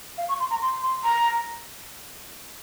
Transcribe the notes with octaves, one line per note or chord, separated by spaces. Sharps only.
F5
C#6
C6
A#5
C6
C6
A#5